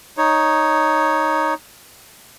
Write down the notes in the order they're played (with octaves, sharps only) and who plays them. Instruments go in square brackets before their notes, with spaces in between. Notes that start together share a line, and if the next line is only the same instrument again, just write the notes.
[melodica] D#4 C#5